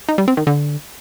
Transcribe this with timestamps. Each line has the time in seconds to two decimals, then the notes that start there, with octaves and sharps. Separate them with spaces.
0.09 D#4
0.18 G3
0.28 C4
0.37 D#3
0.47 D3